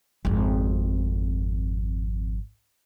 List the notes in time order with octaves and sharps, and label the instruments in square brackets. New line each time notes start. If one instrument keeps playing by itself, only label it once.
[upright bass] G#1 F2